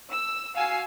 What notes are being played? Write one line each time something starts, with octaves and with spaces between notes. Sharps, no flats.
E6
F#4 F5 G#5 E6 C7